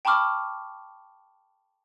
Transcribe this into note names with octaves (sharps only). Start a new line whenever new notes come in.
G5 A5 B5 C#6 D6 F6